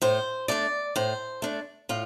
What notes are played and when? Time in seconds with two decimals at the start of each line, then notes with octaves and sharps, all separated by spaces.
0.02 A2 C5
0.48 A3 D4 D5
0.96 A2 C5
1.42 A3 D4
1.89 A2 F4